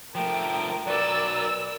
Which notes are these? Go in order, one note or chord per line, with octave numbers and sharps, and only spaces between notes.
F3 A3 A#4 G5
F#3 A#4 B4 D5 E6